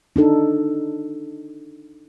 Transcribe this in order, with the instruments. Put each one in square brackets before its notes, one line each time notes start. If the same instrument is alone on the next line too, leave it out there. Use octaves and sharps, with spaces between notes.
[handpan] D4 D#4 A4